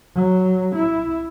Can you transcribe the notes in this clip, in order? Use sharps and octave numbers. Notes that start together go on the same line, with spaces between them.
F#3
E4